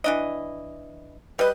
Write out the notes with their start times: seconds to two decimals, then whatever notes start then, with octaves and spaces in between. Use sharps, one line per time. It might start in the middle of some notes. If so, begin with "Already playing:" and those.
0.04 E3 D4 D#5
1.39 G3 B4 D#5